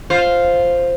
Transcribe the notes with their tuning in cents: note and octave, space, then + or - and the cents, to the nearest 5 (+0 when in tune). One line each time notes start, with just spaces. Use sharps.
F4 +0 C5 +0